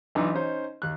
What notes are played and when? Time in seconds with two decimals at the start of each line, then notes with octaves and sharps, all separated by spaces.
0.15 B1 E3 D4 D#4
0.34 C#4 D#4 C5
0.82 D#2 F#6